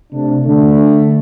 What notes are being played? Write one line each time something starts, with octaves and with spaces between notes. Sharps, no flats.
C3 A3 D4
D3 A3 D4